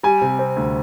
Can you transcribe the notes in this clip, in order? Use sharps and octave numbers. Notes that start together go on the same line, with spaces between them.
G3 G#5
C3
C4
D2